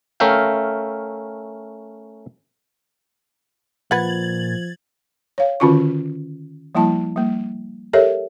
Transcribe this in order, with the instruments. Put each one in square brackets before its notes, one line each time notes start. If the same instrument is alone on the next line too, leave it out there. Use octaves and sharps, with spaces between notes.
[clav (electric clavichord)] A3 C#4 A#4 E5 F5 G5
[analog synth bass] A#2 [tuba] F3 [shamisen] B4 F#5 [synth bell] G#6 A6 F#7
[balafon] C#5 F5
D3 D#3 C#4 F4 F#4 C#6
F3 G3 A#3 E4 A5
G3 A#3
G4 A4 A#4 C#5 D#5 E5